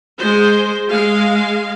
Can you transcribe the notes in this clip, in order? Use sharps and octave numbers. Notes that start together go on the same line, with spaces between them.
G#3 C5
G#3 F5